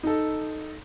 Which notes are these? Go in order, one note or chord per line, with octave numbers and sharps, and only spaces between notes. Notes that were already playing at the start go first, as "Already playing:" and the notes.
D#4 A4